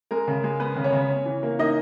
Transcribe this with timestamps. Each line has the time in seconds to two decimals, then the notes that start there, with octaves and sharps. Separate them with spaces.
0.11 G#3 A#4
0.28 C#3
0.44 G#3
0.60 B3 B4
0.76 C#3
0.84 C#4 C#5
0.92 C#3
1.10 C#4
1.26 E3
1.43 A#3
1.59 A#3 D#4 D#5